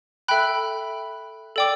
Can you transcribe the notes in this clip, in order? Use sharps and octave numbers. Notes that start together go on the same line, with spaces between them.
A4 E5 G5 B5 F#6
A4 D5 G5 D6